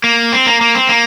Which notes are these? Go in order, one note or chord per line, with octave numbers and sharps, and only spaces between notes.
A#3
C4
A#3
A#3
C4
A#3